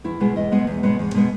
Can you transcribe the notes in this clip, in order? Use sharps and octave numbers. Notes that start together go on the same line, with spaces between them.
E2 E4
B2 G#3 B3
E2 D#5
B2 G#3 B3
E2
B2 G#3 B3
E2
B2 G#3 B3